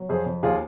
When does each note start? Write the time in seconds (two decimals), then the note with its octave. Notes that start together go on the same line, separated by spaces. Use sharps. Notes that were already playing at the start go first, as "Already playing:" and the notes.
Already playing: F#3
0.09 F2 G#4 C5
0.26 F2
0.43 D#2 F4 G#4